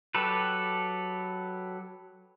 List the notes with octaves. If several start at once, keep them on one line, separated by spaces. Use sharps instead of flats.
F#3 G4 A4 B4